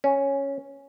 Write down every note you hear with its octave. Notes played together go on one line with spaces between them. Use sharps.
C#4